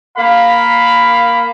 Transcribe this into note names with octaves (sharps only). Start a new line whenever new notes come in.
A#3 A#4 F5 B5